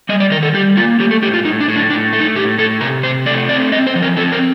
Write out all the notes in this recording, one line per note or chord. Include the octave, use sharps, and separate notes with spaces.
G3 D#5
D5
D#3 A#4
A4
G3 G4
A#3 F4
A3 G4
A4
A2 G4
F4
A2 D#4
D4
A2
D4
A2 D4
A3
D#4
A2 G4
A2 A4
C3 A#4
C3 C5
A3 D5
C4 D5
C4 D#5
C5
F3
A#4
C4 A4
A#4